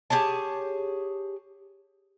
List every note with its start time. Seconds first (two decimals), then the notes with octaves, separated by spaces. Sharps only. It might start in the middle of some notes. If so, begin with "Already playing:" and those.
0.10 G4 G#4 C#5 A5